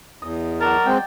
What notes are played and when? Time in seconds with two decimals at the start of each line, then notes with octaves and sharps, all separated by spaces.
0.22 E2 D#5
0.61 F#3 A#4 D5 A5
0.86 G#3 C4 G5